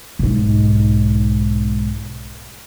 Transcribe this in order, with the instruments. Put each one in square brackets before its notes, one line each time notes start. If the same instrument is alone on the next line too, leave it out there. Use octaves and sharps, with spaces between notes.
[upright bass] B1 G#2